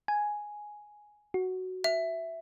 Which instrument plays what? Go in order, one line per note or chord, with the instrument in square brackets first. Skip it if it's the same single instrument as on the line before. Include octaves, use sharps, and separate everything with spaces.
[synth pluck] G#5
F#4
[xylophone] E5